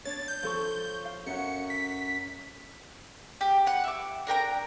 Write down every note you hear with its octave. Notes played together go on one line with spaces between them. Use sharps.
D4 C#5 A6
G6
F3 A4 C#6
F5
F#2 F#5 C#7
B6
G4
B4 F#5
E5 D6
D4 A#4 G5 A#5